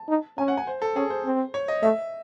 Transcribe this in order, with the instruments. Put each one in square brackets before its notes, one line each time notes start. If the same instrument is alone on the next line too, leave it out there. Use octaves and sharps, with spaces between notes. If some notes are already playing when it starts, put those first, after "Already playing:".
Already playing: [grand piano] A5
[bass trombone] D#4
[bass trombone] C#4 [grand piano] G#5
[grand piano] F#5
G#5
C5
A4
[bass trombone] C#4 [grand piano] G#4
[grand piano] C5
[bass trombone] C4
[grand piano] C#5
D#5
[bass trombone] A3 [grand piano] E5